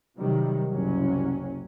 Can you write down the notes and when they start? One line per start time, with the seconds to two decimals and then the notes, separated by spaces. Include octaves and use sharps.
0.17 C3 D#3 F#3 G3
0.71 F#1 C2 F#3 C#4